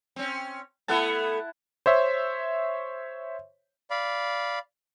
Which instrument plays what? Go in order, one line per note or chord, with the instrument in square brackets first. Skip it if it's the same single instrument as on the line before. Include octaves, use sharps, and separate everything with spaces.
[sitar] C4 C#4
[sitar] A3 B3 A4 [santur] E4 F#5 A5
[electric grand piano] C5 C#5 E5
[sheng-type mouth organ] D5 F5 B5